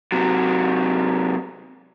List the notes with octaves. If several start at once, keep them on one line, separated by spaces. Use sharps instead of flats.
C3 F#3